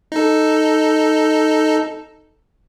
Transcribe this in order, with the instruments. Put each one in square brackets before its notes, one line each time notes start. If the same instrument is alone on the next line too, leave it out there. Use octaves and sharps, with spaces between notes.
[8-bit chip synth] D#4 A4